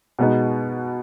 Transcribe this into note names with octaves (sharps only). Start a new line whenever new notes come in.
B2 G#3 B3 D#4